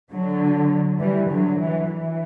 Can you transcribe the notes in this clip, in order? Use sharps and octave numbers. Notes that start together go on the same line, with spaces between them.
D3 F#3
E3 G3
D3 F#3
E3
E3